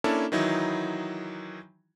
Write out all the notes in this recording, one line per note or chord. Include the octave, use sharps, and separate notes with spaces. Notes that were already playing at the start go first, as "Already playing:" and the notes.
A#3 C#4 D4 E4 A4
D#3 E3 F#3 D#4 E4